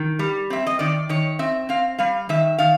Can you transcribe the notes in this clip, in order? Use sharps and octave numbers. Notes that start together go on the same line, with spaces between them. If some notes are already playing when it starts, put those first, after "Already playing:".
Already playing: D#3
G3
C4 E5
D#5
D#3 D5
D#3 C#5
C4 E5
C4 F5
G3 F5
D#3 E5
D#3 F5